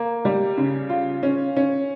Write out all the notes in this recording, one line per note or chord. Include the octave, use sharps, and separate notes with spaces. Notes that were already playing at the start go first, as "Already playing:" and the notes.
Already playing: A#3
G3
C#3
F4
C#4
C#4